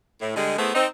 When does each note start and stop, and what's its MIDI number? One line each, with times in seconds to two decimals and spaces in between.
0.20 0.33 45
0.35 0.56 50
0.35 0.56 55
0.35 0.56 56
0.58 0.73 57
0.58 0.73 59
0.58 0.73 60
0.58 0.73 64
0.58 0.73 68
0.74 0.85 60
0.74 0.85 63